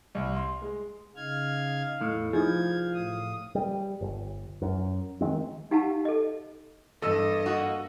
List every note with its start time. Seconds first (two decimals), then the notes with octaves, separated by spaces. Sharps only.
0.15 C2
0.37 C6
0.62 G#3
1.16 C#3 D#4 D#5 F5 F6 G#6
2.01 E2 A2
2.33 C2 F3 D#4 E4 G#4 F5 G#6
2.94 A2 D#6
3.55 G3
4.01 G1
4.62 F#2
5.21 D#3 F#3 G#3 C4
5.71 D#4 G4 F5 F#5 A5
6.05 A4 D#5
7.02 E2 G2 A4 D#5 E6
7.45 A#3 F#4